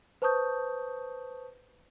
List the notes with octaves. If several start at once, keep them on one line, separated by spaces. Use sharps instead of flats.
B4 C5 A5 C#6 D#6 G6